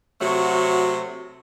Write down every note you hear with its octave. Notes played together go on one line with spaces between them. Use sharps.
C3 F#3 A3 F#4